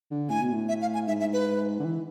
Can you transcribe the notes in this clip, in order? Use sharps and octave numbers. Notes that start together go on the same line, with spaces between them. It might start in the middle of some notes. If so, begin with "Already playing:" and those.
D3
A2 G#5
B2
A2
E5
F5
G#5
G#2 E5
E5
B4
D3
E3